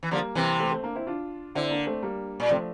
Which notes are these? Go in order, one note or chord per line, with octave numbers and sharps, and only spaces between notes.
E3
D3 F3 G3 A#3
C3 E3
A3 C4
A3 C4
A#3 D4
C4 E4
D4 F4
D3 C4 E4
A#3 D4
A3 C4
G3 A#3
A#2
C3 F3 A3